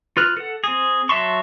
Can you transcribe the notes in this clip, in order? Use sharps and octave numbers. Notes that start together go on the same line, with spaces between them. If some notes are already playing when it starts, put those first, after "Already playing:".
F4 B4 F6 F#6
A4 F#5
C4 G#4
F#3 E5 A5 C6 C#6